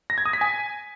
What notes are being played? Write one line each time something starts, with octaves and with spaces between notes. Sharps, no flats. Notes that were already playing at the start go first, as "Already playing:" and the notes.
A#6
G#6
D#6
B6
G#5